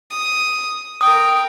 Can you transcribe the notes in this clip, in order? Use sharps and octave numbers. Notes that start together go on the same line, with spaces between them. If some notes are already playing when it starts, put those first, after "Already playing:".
D#6
A#4 G5 D#6